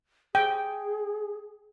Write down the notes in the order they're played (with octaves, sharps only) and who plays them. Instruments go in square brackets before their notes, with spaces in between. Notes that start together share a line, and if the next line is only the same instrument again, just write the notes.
[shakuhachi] G#4 [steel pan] G5